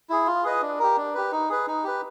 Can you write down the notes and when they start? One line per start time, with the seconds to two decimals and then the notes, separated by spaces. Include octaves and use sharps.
0.10 E4 G#4
0.27 F4
0.44 G#4 B4 D#5
0.62 D4
0.79 G4 A#4
0.97 D4
1.14 G4 B4
1.32 D#4
1.49 G#4 B4
1.67 D#4
1.84 G4 B4